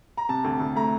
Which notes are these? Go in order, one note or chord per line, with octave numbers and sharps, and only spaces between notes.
A#5
C3 A5
D2
D2
A3 A#5